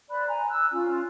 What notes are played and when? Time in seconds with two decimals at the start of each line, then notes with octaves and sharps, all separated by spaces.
0.10 C5 D5 B5 F#6
0.28 G#5 A#5
0.49 E6 F#6
0.72 C#4 F4